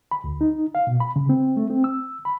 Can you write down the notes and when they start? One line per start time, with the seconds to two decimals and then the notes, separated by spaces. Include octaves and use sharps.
0.11 B5
0.24 D2
0.41 D#4
0.75 F5
0.87 B2
1.00 B5
1.16 C#3
1.29 C4
1.57 A3
1.70 C4
1.84 E6
2.25 B5